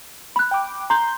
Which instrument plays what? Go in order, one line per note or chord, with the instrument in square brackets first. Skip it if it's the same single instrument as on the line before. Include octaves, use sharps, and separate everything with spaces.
[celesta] B5 F#6
[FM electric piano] G5 D6
[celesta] A#5 [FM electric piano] C6 G6